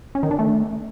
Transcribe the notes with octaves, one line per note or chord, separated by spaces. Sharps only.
C#4
D#3
D4
A3